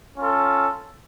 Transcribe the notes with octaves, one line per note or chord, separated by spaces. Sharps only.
C#4 F4 A4